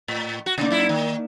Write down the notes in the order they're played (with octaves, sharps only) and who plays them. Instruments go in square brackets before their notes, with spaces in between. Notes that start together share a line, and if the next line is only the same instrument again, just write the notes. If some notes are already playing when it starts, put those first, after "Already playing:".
[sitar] A2
F#4
[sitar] C#3 [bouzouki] A#3 D#4 D5
[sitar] F#2 E4
D#3